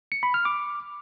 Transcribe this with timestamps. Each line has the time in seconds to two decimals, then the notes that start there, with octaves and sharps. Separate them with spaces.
0.12 C#7
0.23 B5
0.34 F6
0.45 D6